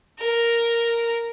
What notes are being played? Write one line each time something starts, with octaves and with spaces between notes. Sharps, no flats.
A#4